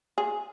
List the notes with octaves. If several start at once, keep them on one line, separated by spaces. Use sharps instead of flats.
G#4